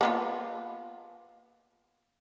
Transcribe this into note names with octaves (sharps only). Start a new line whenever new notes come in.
A#3 B3 F4